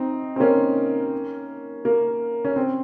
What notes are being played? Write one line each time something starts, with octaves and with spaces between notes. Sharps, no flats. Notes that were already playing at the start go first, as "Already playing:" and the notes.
Already playing: C4 D#4
C4
A#3 C#4
A#3
C#4
C4